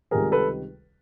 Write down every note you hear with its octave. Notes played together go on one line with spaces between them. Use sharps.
C#2 C3 D#3 G3 G#4 A#4
A4 B4